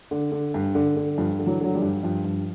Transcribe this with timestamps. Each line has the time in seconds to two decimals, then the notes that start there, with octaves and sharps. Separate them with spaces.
0.11 D3
0.32 D3
0.54 G2
0.75 D3
0.97 D3
1.18 G2 F3
1.39 D3
1.46 E3 F#3
1.60 D3 F#3
1.74 F3 G3
1.82 G2
2.03 G2 F3
2.25 G2